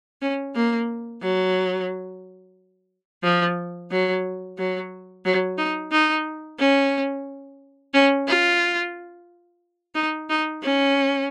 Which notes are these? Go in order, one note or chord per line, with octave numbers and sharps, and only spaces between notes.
C#4
A#3
F#3
F3
F#3
F#3
F#3
D#4
D#4
C#4
C#4
F4
D#4
D#4
C#4